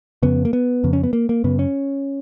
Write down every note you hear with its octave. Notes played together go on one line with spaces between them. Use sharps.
F2 C#3 B3
A#3
B3
F2 C#3
C#4
B3
A#3
A#3
F#2 C#3 B3
C#4